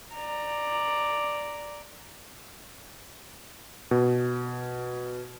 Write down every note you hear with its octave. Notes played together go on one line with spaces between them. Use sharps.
D5 A#5
B2